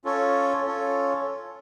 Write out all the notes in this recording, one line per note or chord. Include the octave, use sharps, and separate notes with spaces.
C#4 F4 A4 C#5
C#4 F4 A4 C#5